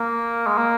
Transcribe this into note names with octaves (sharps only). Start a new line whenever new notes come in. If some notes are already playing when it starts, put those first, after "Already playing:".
Already playing: A#3
G#3
A#3